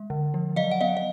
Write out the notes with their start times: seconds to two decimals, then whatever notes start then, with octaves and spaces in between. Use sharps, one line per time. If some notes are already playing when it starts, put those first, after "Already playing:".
Already playing: G#3
0.10 D3
0.34 F3
0.56 F#3 D#5 F5
0.71 F#5
0.81 B3 D#5 F5
0.97 D#5